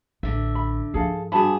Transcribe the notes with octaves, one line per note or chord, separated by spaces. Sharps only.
A1 D3 E5
B5
G#2 F3 G#4 A4 F5
G2 F#4 G#4 A5 B5